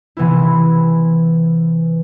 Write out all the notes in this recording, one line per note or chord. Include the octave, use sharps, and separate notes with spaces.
C3 E3 B3 E4